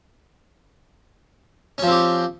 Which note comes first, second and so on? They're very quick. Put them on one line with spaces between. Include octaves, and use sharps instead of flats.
C#4 F3 C4 G4